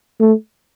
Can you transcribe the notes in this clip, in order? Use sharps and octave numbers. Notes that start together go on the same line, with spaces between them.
A3